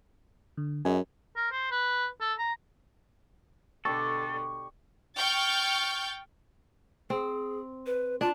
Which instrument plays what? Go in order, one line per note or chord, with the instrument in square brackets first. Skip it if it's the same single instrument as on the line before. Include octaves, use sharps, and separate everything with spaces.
[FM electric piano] D3
[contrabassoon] F#2 [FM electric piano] G#4 D#5 G#5
[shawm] A#4
C5
B4
A4
A#5
[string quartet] B2 D3 [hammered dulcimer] G4 D5 [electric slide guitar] A4 [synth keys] C#6
[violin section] G5 C#6 F6 G6 A6
[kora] C4 [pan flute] G#4
[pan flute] B4
[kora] D4 [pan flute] F4